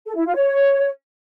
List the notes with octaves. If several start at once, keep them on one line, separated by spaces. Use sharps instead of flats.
A4
E4
F4
C#5